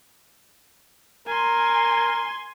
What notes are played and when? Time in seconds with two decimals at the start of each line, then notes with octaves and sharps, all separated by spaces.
1.28 A#4 G#5 C6